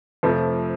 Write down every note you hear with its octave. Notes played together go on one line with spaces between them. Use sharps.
F2 C3 F3 A3